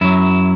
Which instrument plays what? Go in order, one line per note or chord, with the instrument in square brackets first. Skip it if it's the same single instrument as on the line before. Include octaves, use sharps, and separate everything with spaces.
[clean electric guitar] F#2 F#3 E4